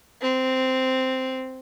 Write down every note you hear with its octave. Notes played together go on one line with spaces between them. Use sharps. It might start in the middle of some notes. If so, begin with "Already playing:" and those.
C4